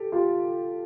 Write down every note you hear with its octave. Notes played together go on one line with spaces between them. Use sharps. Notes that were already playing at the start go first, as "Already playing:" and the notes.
Already playing: G4 A4
F4 G4